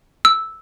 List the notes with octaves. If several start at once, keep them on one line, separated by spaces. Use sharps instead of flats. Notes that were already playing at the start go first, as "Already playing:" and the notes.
E6